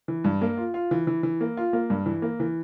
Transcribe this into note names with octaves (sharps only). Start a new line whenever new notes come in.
E3
G2
A#3
F4
F4
E3
E3
E3
A#3
F4
A#3
G2
E3
A#3
E3